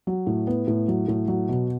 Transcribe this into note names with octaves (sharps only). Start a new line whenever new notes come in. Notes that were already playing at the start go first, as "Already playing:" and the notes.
F#3
A2
B3
A2
F#3
A2
F#3
B2